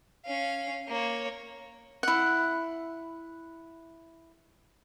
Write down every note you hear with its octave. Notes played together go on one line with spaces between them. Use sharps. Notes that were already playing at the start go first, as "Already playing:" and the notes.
C#4 F5
A#3 C#5
E4 F#5